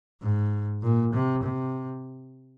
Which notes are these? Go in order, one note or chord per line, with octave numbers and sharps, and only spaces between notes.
G#2
A#2
C3
C3